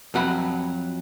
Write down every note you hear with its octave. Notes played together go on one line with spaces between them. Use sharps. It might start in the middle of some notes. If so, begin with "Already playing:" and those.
F2 F#3 F#5 B5